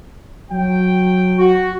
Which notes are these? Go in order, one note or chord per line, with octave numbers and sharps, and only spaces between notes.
F#3 G5
F#4